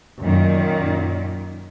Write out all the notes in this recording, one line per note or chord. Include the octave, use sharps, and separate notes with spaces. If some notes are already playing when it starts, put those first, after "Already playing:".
F#2 A#2 D#3